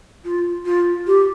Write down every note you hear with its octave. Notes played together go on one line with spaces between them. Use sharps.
F4
F4
G4